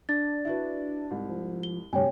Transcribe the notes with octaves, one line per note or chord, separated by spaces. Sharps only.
D4 A6
E4 F#4 B4
C2 G#2
F3
G7
D2 G2 C3 C#5 G5 G#5